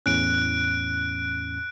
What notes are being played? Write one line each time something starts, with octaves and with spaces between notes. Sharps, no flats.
E2 A2 C#4 F#6 D7